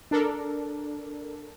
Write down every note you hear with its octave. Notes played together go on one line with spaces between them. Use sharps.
D4 A4 A#4